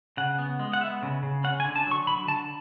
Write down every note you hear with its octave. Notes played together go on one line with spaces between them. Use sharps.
C#3 F#5
B3
G#3
F#5
B3 E5
C#3
C#3
C#4 F#5
G#5
D3
A5
F#3 C#6
D3 B5
D3 A5